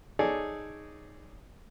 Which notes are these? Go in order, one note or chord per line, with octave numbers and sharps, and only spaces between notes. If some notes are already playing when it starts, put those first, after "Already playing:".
D#4 G#4 A4 C#5 D5